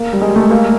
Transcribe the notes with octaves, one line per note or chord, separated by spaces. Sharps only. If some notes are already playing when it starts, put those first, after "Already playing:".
Already playing: A#3
G3
G#3
A3
A#3